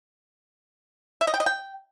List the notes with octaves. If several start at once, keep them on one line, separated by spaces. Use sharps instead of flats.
E5
D#5
G5
D#5
G5